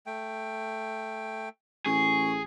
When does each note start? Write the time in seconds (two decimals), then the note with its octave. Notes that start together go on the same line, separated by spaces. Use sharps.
0.06 A3 G5
1.86 A1 G#4 C#6